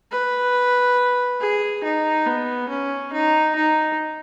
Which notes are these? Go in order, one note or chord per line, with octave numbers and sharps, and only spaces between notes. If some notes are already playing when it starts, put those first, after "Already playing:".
B4
G#4
D#4
B3
C#4
D#4
D#4